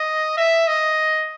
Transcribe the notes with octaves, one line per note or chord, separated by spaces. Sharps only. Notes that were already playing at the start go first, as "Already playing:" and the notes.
Already playing: D#5
E5
D#5